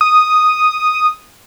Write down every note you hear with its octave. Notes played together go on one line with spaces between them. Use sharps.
D#6